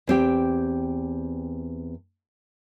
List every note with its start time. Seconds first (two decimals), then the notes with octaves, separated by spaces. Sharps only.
0.07 E2 C4 G4